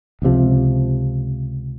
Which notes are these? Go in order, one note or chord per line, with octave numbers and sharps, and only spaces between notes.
C#2 C3 F3